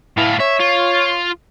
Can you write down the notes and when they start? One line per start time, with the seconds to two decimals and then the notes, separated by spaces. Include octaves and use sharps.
0.17 A2 E4 F4
0.40 C#5 E5
0.60 F4